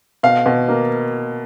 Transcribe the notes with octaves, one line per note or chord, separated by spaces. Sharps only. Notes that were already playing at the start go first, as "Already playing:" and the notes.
B2 F5
B2
A#3